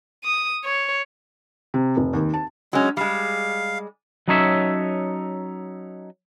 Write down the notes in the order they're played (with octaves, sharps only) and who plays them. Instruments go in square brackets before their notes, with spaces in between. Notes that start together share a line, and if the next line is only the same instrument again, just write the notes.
[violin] D#6
C#5
[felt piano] C3
F1
D#2
A5
[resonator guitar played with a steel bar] F#3 C#4 [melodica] G#3
[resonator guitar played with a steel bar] G3 G#3 [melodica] F5
[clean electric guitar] F#3 C#4 D#4 A4 C#5 E5